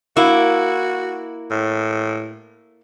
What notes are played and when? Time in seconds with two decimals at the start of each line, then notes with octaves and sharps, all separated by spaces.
0.17 A#3 E4 F#4
1.50 A2